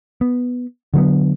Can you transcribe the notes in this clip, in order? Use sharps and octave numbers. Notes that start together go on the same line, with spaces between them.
B3
D3 F#3 A#3 B3